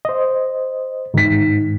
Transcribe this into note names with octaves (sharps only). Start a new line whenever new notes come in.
C5 D#5
G#2 D#3 B6